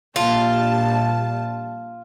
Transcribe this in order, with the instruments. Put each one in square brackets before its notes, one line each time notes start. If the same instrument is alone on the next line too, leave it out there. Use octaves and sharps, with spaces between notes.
[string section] A#1 G3 A5 [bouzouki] F4